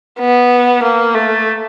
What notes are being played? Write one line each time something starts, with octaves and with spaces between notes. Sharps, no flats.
B3
A#3
A3